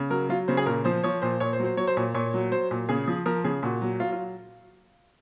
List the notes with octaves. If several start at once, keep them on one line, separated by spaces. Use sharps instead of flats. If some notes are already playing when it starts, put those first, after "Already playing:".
Already playing: C#3
F#3 A#4
F#3 F4
C#3 C5
G#4
A#2 A#4
F3 C5
F3 C#5
A#2 C5
A#2 C#5
C5
F#3
C5
F#3 C#5
C5
A#2 C#5
A#2 C#5
F#3
F#3 C5
A#2
C#3 G#4
F3
F3 A#4
C#3 G#4
A#2 F#4
F#3
F#3 F4
F4